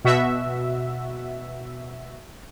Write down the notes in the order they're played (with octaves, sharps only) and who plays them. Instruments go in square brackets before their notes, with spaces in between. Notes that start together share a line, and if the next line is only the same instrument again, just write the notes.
[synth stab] B2 F#4 E5